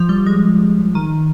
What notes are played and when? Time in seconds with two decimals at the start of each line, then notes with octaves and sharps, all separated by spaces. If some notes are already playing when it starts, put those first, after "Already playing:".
Already playing: F3
0.09 G3
0.26 G#3
0.95 D#3